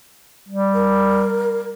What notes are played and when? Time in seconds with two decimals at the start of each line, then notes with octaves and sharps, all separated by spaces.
0.49 G3
0.74 A#4